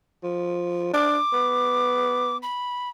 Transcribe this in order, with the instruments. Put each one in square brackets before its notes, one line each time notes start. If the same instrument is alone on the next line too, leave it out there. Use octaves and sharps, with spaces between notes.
[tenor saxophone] F3
[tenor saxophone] D4 [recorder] D6
[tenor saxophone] B3
[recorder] B5